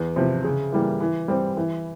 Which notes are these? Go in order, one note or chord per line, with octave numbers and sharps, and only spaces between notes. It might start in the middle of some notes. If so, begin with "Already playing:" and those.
Already playing: E2
C3 F3
C#3
E3 G3 A#3
E3
G3 C4
E3